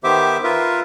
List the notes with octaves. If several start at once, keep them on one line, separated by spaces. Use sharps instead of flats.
D#3 B3 G4 C5 E5 D6
F4 A#4 B4 E5